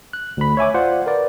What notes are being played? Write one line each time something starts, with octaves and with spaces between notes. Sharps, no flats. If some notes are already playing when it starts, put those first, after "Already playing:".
F#6
D2 B5
C#5 E5 G#5 D6
F4 C5 D5 F#5
A#4 B4 D5